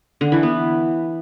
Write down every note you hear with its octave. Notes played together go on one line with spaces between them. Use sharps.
D3
E3
B3